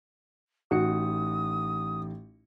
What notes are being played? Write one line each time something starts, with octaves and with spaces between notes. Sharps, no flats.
A1 D#4 F#4 D#6 C#7